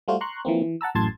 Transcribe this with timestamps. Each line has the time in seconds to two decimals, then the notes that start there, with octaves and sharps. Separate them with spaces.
0.08 G3 A3 F4 F#4 C5
0.21 A#5 C6 C#6 F#6
0.45 E3 F3 A#3 C4
0.62 E3
0.81 F#5 A5 A#5 E6
0.95 A1 F#2 A2 A5 C6 G#6